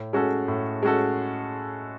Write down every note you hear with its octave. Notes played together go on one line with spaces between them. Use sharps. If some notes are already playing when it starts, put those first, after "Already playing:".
Already playing: A2
G#3 C#4 F#4 A4
A2
G#3 C#4 F#4 A4